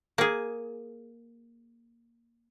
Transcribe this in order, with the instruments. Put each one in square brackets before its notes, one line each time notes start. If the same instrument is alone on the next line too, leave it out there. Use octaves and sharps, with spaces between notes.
[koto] A#3 G#4